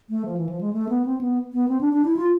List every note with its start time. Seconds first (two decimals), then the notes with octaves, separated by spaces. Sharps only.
0.10 A3
0.25 F3
0.37 E3
0.49 F3
0.61 G#3
0.73 A3
0.89 B3
1.06 C4
1.21 B3
1.53 B3
1.69 C4
1.81 D4
1.93 D4
2.05 E4
2.16 F4